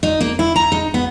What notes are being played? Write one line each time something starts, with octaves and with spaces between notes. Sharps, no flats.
D#4
A#3
E4
A#5
D#4
B3